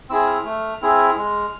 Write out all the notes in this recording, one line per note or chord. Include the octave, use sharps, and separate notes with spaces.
C4 E4 G#4 E6
F6
A3
C4 E4 G#4
G#3